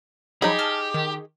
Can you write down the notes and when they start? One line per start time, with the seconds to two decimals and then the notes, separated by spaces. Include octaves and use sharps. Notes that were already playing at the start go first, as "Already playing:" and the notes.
0.42 F3 F#3 D#4 G4 G#4 B5
0.59 A5 F6
0.94 D#3